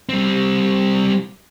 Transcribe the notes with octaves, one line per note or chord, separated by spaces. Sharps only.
G3 C4